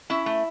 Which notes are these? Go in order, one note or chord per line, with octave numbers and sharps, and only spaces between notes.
C#4 E4 E5
A3